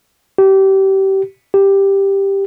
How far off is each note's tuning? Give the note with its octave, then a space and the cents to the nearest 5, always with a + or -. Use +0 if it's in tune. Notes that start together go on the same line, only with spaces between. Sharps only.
G4 -25
G4 +5